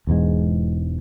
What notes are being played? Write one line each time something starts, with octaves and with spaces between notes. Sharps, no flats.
E1 E2 G#2 G#3